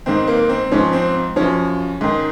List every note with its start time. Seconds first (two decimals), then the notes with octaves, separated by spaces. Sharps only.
0.06 G#2 D#3 C4
0.28 A#3
0.49 C4
0.72 G#2 F3 C#4
0.93 C4
1.36 F#2 F3 C#4
2.01 G#2 D#3